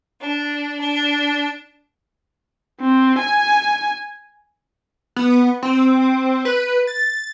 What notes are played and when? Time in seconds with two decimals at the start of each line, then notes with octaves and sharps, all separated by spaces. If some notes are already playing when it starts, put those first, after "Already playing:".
0.20 D4
0.80 D4
2.81 C4
3.18 G#5
5.16 B3
5.63 C4
6.45 B4
6.87 A6